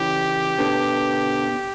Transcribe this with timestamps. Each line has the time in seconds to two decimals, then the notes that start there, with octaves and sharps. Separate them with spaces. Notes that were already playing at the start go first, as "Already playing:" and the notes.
Already playing: C#3 E3 G4
0.59 B2 D3